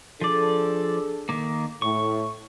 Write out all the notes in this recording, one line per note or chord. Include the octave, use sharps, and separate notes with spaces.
F3 D4 G#4 A4 D5
D#3 A#3
A2 C#6